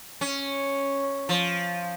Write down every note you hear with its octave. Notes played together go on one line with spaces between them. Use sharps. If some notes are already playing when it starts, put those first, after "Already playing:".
C#4
F3